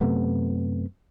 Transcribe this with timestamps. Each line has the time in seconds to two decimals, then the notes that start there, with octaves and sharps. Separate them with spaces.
0.01 F#2 C3 A3 B3